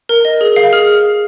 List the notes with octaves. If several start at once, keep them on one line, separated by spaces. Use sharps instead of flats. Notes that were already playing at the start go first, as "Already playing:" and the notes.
A#4
D#5
G#4
F5
G#4 F6